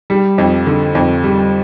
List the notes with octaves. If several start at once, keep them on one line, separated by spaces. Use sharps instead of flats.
G3
F2
D3
F2
G3